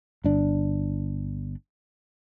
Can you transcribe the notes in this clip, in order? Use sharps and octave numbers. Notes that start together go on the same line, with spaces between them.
G1 D4